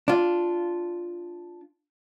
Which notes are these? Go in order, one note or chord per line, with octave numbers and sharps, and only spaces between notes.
D4 F4